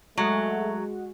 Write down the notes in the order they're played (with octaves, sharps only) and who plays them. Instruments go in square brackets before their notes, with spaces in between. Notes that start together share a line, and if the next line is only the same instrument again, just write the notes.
[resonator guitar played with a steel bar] F#3 [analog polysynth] G#3 F#4 [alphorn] A3